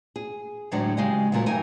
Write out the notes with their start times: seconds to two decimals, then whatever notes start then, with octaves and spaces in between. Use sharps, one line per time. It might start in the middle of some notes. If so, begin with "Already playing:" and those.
0.16 G#4
0.71 D2 A2 D3 F#3 G#3 D4
0.97 C#3 G#3 F#4 G4 D#5
1.32 A#2 D3 F#3 A3 C4 A#4
1.46 G2 E3 F#3 D#4 A#4 G#5